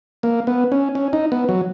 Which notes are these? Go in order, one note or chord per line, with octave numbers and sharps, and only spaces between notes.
A#3
B3
C#4
C#4
D#4
B3
F#3